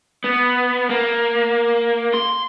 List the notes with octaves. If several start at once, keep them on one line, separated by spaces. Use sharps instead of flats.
B3
A#3
C6